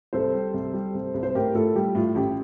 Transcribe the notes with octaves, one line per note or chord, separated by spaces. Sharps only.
C2 A4 C5
G3
C2
G3
C2
C2
C5
A2 G4 A#4
A2 F4 A4
G3 G4
A2 F4
A1 G4